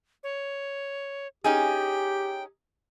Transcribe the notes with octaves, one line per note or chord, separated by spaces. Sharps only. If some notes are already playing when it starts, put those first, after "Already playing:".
C#5
C#4 D#4 G4 G#4 G5